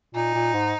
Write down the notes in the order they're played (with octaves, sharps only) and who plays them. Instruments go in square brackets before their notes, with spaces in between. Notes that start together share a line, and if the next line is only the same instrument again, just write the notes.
[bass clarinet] A#2 [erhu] D#4
[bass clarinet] A#2
G#2